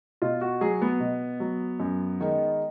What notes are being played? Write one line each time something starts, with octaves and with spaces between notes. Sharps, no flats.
B2 F4
F#4
F#3 G#4
B3
B2
F#3
F#2
D#3 G#3